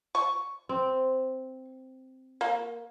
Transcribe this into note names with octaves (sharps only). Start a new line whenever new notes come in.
C#6
C4
A#3